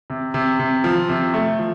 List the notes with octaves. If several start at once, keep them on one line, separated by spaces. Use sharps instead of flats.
C3
C3
C3
F3
C3
A3
F3